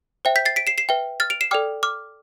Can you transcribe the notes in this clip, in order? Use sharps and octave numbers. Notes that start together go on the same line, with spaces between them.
C5 E5 G5
G6 B6
A6 C7
B6 D7
C7 E7
C7 E7
B4 E5 G5
F6 A6
D7 F7
C7 E7
A4 D5 G5 D6 F6
D6 F6